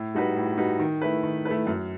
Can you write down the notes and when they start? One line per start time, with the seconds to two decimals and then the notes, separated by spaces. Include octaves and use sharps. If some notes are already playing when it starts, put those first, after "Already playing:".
Already playing: A2
0.14 G3 D#4 F#4 B4
0.35 A2
0.58 G3 D#4 F#4 B4
0.79 D#3
1.01 A3 E4 B4
1.23 D#3
1.45 A3 E4 B4
1.67 F#2